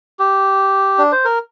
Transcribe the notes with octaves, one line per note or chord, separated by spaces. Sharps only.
G4
D4
C5
A#4